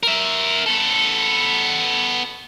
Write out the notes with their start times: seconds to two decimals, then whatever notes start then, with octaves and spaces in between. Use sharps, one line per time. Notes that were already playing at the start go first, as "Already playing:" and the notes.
0.03 A#4 E5
0.66 B3 A4